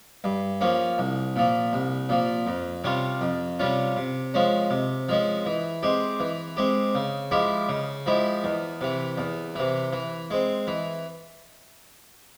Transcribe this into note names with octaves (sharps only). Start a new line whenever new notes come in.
G2
F3 A#3 C#4
C2
A#2 F3
C2
A#2 F3
F2
C3 G3 C#4 F4
F2
C3 G3 C#4 F4
C3
F3 G#3 C#4
C3
F3 G#3 C#4
E3
G#3 C4 G4
E3
G#3 C4 G4
C#3
F3 G#3 E4 G4
C#3
F3 G#3 E4 G4
E2
C3 E3
E2
C3 E3
E3
G#3 C4
E3